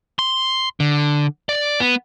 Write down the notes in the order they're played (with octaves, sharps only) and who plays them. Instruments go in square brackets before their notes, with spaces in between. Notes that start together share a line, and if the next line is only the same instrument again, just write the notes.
[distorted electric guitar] C6
D3
D5
B3